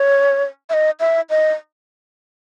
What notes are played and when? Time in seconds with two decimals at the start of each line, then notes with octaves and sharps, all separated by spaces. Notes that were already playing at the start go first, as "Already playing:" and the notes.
Already playing: C#5
0.70 E5
0.73 D#5
1.00 E5
1.30 D#5